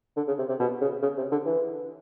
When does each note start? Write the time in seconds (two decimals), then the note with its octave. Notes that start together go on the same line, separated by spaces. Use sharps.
0.17 D3
0.27 C#3
0.38 C3
0.49 C3
0.60 B2
0.81 C#3
1.02 C#3
1.17 C3
1.32 D3
1.46 E3